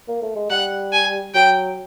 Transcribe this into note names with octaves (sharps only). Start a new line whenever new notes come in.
A#3
A3
G#3
G3 F#5
G#5
F#3 G5